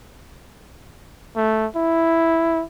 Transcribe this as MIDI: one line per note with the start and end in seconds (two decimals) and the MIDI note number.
1.36 1.67 57
1.76 2.64 64